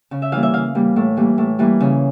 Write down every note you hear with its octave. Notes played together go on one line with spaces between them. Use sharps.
C#3
E5
E3 G3 A#3 F5
E5
C#3 F5
E3 G3 A#3
A2
E3 G3 A#3
A2
E3 G3 A#3
C#3